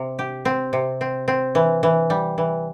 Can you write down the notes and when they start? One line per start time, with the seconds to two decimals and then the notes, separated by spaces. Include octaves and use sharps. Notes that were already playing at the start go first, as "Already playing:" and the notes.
Already playing: C3
0.19 G4
0.45 C4
0.73 C3
1.01 C4
1.28 C4
1.55 E3
1.83 E3
2.10 G3
2.38 E3